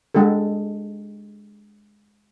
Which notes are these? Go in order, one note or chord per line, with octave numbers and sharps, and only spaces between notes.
G#3 D4 G4 A4